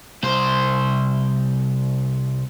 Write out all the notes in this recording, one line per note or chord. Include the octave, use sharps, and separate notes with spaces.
C2 C5